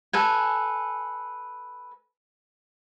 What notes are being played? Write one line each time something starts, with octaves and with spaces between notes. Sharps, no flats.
A4 B4 G#5